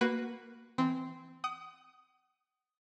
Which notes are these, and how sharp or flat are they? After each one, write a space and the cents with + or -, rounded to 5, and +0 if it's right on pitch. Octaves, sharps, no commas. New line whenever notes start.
A#3 +0 F#4 +0 B4 +0
E3 +0 C4 -15
F#5 +40 D#6 +0